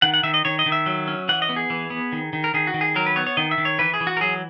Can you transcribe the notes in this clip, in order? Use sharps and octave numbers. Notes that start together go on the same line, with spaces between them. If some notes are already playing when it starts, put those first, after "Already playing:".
D#3 F#5
F#5
D#3 E5
D#5
D#3 C#5
D#5
D#3
E5
F#3
C#4
E3 F#5
D#5
B3
G#4
E3
B3
D#3
D#3
A#4
D#3 G#4
F#4
D#3
G#4
F#3 A#4
B4
B3 C#5
C#5
D#3 D#5
E5
D#3
C#5
E3 B4
G#4
E3
F#4
A#4
F#3 G#4